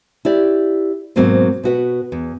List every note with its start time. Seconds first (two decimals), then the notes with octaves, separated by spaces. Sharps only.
0.25 E4 G4 D5
1.16 G#2 B2 F#3 A#3 C4
1.64 B2 F#4 B4
2.12 E2